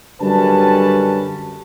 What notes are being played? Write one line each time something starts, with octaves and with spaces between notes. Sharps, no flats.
F#2 D3 G3 C#4 B4 A5